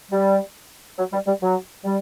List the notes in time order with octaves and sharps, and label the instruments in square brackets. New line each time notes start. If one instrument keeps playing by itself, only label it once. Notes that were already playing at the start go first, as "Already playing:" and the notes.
[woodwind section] G3
F#3
G3
G3
F#3
G3